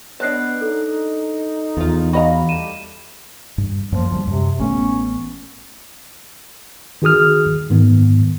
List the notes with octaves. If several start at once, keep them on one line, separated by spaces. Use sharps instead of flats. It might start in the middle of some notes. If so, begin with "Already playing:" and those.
B3 D4 C#5 D#5 A5 F#6 C7
D#4 A4
E2 F3 F4
F#4 D#5 F5 A#5 B5
G3 A3 D#7 E7
G2
F#2 F3 G#3 A#3
D2 G3
F#2 C3
A1 A3 B3 C#4
D#3 F#4 G#4 D#6 F6
G#2 D#3 B3